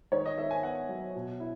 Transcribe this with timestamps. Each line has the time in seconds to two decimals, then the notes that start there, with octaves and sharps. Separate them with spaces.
0.12 D#3 C#5
0.26 D#5
0.38 D#3 E5
0.51 G#5
0.63 B3 F#5
0.89 F#3
1.15 B2
1.40 E4